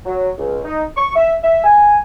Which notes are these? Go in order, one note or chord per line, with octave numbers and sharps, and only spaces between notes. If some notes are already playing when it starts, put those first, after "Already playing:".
F#3
C#2
D#4
C#6
E5
E5
G#5